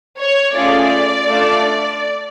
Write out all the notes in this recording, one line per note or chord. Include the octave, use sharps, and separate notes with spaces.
C#5
A3 C#4 F4 G#4 D5
A3 D4 F4 A4